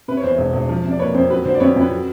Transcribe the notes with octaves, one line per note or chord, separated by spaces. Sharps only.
C3 B4
C#5
E2 C5
E1
E1
F3
C3
D5
A#3 B4 C#5
F2 C5
F#3 B4
D3 C5
D5
F2 B4 C#5
F2 B4
F#3